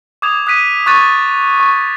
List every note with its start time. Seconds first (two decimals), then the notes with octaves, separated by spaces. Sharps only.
0.22 D6 D#6 G#6 F7
0.47 D#6 F#6 B6 D#7
0.86 C#6 D6 F#6 G#6 A6 D#7
1.60 C#6